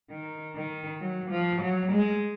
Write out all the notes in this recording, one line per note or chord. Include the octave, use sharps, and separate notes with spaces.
D#3
D#3
F#3
F3
F#3
G#3